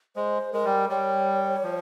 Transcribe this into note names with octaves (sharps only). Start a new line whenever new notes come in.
G#3 C5
G#3 A#4
G3
G3 C#5
F3